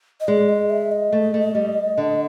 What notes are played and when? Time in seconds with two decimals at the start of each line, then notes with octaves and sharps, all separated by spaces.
0.21 D#5
0.28 G#3 D5
0.49 D#5
0.70 E5
0.92 D#5
1.12 A3
1.34 A3
1.55 G3
1.98 D3